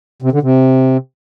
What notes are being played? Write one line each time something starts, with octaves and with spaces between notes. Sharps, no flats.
C3
D3
C3